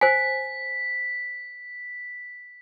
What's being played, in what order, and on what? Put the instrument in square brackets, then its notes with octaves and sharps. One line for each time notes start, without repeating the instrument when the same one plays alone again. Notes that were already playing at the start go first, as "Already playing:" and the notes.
[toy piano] C5 G#5 [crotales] B6